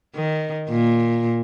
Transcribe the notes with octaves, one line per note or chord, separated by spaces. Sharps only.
D#3
A#2